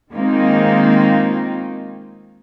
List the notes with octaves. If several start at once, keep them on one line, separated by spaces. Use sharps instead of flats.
D#3 G#3 A#3 C4 D#4 F4